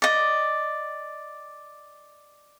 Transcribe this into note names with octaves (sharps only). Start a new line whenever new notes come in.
D5 D#5